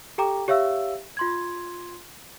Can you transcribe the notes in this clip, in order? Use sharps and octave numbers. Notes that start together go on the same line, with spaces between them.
G4 A4 G5 A#5 D6
G4 C#5 E5 F5 E6
F4 C6 G#6